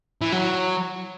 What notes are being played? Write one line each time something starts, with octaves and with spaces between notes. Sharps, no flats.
E3
F#3